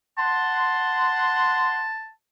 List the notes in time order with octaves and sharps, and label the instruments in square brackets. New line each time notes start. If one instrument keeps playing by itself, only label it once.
[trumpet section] F#5 C6 [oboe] A5